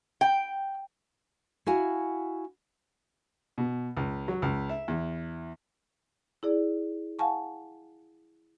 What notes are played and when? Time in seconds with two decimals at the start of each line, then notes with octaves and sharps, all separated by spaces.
0.21 G5
1.67 E4 F#4 F5 F#5 G#5
3.58 B2
3.97 C#2
4.28 F#3
4.42 C#2
4.69 E5
4.88 E2
6.43 E4 G#4 D5
7.19 F5 F#5 G#5 A5 C#6